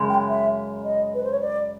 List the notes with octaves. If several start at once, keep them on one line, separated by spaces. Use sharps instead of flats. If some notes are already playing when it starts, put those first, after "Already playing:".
Already playing: F#2 C#3 G#3
G5
E5
D#5
B4
C5
C#5
D5